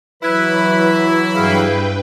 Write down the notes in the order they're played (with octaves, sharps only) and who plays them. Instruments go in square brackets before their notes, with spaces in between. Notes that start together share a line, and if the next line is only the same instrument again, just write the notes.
[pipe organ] E3 F#3 B5 [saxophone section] E4 [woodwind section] B4
[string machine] G2 B4 G5 [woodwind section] G#4 F5